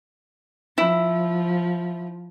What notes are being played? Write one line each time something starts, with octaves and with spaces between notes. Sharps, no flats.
F3 E4